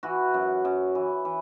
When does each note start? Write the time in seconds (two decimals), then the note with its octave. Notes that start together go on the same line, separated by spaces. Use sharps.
0.03 E3 F#4
0.34 F#2
0.65 F#2
0.95 E3
1.25 E3